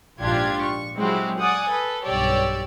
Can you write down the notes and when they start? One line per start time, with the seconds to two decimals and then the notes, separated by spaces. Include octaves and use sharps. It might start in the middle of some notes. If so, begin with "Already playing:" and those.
0.20 A#1 G#2 D4 F4 G4 G#6
0.61 C#6
0.96 F#3 G#3 C4 E4 F#4 G4
1.40 D5 F#5 G#5 D#6
1.70 A4 B4
2.05 B1 G2 G4 C#5 D5 E6